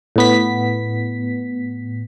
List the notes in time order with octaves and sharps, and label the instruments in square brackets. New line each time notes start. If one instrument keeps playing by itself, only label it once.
[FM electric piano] A2 B3 B6